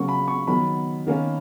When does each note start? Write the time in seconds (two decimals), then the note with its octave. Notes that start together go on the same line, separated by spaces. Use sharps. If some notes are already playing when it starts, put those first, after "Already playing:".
Already playing: C#3 F#3 A#3 C#6
0.08 B5
0.28 C#6
0.47 D#3 F#3 B3 B5
1.07 D#3 A#3 C#4